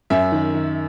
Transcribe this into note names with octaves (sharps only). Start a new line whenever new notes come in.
F#2 E5
D#3
D#3